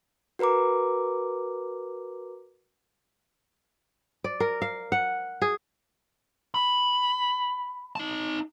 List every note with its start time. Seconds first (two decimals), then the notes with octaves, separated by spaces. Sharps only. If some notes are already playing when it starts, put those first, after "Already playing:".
0.39 F#4 A#4 B4 A#5 D6
4.24 D5
4.40 A#4
4.62 F5
4.92 F#5
5.42 G#4
6.54 B5
7.96 D#4 A5